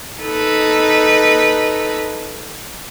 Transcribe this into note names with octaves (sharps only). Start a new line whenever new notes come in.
D#4 A4 B4